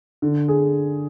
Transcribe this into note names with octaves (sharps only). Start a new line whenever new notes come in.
D3
G#4